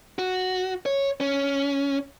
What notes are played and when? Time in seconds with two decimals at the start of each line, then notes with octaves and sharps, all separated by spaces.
0.19 F#4
0.86 C#5
1.21 C#4